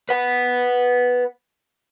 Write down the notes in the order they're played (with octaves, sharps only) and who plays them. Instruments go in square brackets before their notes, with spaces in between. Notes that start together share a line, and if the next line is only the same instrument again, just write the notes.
[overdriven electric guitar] B4 F#5